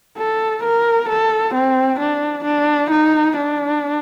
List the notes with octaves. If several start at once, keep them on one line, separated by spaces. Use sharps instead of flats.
A4
A#4
A4
C4
D4
D4
D#4
D4